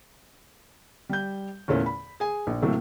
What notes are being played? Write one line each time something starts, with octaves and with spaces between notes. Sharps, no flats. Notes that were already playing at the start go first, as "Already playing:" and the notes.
G3 G6
E2 A#2 A3 C#4
B5
G#4 G#5
A#1
A2 C3 F#3 A3 A#3